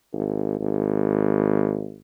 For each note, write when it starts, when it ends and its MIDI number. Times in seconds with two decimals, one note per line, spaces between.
0.13 0.56 32
0.60 1.98 32